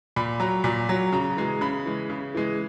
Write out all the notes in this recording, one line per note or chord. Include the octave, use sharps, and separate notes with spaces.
A#2 B5
F#3 A#5
A#2
F#3
C#3 A#5
E3 G#3
C#3 B5
E3 G#3
C#3
E3 G#3